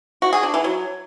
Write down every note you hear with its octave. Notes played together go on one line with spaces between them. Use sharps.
F#4
G#4
D4
E3
F#3